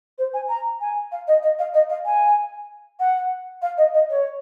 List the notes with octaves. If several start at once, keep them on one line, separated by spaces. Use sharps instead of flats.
C5
G#5
A#5
G#5
F5
D#5
D#5
F5
D#5
F5
G#5
F#5
F5
D#5
D#5
C#5